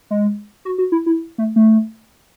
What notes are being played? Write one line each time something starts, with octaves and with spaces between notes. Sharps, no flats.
G#3
F#4
F#4
E4
E4
A3
A3